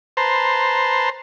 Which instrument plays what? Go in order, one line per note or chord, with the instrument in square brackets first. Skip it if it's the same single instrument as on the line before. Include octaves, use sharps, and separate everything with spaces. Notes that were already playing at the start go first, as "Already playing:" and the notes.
[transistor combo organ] B4 C5 A5 A#5 C6